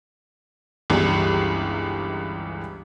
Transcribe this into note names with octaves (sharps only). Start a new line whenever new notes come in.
G1 C#2 E3 G3